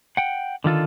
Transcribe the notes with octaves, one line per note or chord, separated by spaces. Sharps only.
F#5 G5
D3 D#3 F4 A4